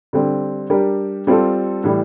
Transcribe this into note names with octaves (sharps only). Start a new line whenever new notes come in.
D3 G3 C4
G3 D4 G4 A#4
G3 C4 F4 A4
A2 E3 G3